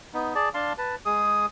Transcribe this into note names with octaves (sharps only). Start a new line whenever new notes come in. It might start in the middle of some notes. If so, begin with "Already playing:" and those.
B3 D#4
G#4 D5 A5
D4 F5 A5 C6
B4 A5
G#3 G#4 D#6